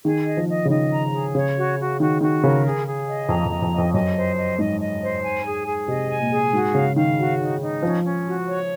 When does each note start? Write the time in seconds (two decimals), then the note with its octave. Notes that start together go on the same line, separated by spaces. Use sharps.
0.05 D#3 G#4
0.27 D#5
0.37 F3
0.48 D#5
0.65 C#3
0.70 D#3 D#5
0.92 A#5
1.13 G#4
1.35 C#3 C#5
1.57 F#4
1.78 F#4
2.00 D#3 F#4
2.21 D#3 F#4
2.43 C#3 A#4
2.65 G#4
2.86 G#4
3.08 D#5
3.29 F2 A#5
3.45 F2
3.51 D#5
3.62 F2
3.72 D#5
3.78 F2
3.94 F#2 D#5
4.15 C5
4.37 D#5
4.59 G#2 D#5
4.81 D#5
5.02 C5
5.24 G#5
5.46 G#4
5.66 G#4
5.88 C3 D#5
6.10 G#5
6.20 A#2
6.31 G#4
6.53 G#2 F#4
6.74 C#3 F5
6.96 D#3 F5
7.18 F#4
7.39 D#4
7.61 D#4
7.83 F3 C#4
8.04 C#4
8.26 F#4
8.47 C#5